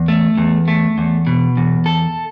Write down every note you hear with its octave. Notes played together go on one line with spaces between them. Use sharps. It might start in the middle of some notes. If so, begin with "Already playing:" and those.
Already playing: E2
A3
E2
A3
E2
B2
E2
A4